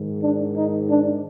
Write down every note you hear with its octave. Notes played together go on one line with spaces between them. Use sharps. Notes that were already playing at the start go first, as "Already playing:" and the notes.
Already playing: G#2 D#3
D4
D#4
D4